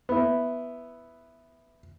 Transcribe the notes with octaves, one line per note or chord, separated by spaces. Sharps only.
B3 E4